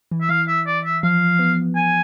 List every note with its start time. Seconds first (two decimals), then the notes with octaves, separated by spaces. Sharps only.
0.11 E3
0.21 E5
0.29 E3 F5
0.48 E5
0.66 D5
0.84 E5
1.03 F3 F5
1.39 B3
1.76 G#5